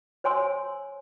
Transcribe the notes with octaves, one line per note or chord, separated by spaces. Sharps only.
C5 C#5 G#5 C6 E6